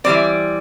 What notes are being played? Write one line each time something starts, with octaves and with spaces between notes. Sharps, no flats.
E3 G3 C4 D5